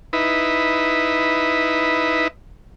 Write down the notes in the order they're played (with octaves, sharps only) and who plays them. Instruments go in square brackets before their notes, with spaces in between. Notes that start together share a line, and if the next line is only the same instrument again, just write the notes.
[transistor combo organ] D#4 E4 B4